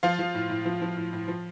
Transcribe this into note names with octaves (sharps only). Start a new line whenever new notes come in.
F3 F4 F5
F3
A2
A2
F3
F3
A2
A2
F3